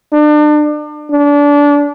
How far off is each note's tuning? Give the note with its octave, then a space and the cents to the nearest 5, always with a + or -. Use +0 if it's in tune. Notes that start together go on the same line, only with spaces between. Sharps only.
D4 +35
D4 -25